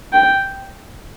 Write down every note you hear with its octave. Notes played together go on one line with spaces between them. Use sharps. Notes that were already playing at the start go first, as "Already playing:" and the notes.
G5